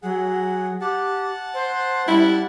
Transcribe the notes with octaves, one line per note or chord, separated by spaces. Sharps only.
F#3 G#4 F#5
G4 F#5 A5
C5
G3 E4